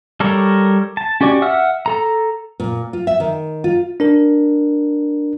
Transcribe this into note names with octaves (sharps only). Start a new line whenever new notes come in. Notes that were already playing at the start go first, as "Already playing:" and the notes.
G3 A4 A#4 C#5
A5
C#4 F#4 G4 D5 C#6
E5 F#5 E6 F6
A4 A#5
A#2
F4
E5
D#3
F4
D4 A#4